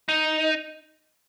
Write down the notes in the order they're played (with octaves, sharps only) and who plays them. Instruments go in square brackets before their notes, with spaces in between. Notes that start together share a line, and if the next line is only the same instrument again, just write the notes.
[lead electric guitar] D#4